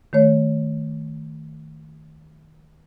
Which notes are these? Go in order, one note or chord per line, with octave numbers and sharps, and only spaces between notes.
D#3 A3 C#5